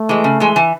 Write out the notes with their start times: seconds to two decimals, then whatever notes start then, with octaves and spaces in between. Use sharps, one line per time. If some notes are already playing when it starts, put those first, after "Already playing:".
Already playing: A3
0.09 E3 G#3
0.24 C#3
0.40 E3 G#3
0.56 E3